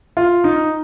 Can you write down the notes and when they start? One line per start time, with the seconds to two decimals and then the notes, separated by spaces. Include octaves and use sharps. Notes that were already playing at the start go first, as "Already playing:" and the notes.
0.17 F4
0.44 D#4